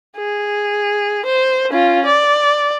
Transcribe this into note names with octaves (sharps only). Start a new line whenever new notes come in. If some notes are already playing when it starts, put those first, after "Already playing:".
G#4
C5
C#4 F4
D5